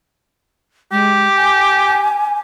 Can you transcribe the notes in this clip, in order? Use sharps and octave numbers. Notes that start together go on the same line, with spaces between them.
G#3 G4
G#5